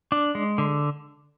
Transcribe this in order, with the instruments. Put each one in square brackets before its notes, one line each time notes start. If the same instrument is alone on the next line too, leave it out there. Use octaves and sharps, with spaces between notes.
[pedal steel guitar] D4
G#3
D3